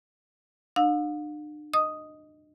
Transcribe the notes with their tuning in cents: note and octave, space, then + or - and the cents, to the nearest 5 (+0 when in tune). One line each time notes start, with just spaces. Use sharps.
D4 +40 F5 +45 E6 +0
D#5 +0 D#6 +0